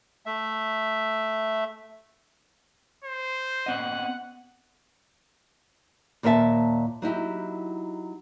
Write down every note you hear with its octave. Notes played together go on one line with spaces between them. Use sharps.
A3 E5
C5
B3 C4 D#5 F#5
D#2 A#2 A#4 D#5 E5 A5
F#3 D#4 E4 G4